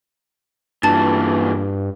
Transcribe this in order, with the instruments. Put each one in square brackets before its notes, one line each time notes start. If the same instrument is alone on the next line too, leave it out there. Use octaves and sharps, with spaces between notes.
[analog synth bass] G2 [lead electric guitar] A#2 E3 [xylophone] A5 A6